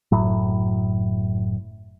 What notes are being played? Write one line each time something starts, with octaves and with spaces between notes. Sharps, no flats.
F#1 A2 F#3